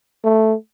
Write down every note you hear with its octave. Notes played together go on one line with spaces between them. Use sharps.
A3